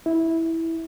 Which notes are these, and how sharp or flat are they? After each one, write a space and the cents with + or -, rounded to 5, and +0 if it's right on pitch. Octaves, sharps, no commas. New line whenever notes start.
E4 -10